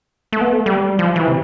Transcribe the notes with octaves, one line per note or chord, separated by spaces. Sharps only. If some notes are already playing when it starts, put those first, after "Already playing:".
A3
B3
A3
G3
F3
E3
C3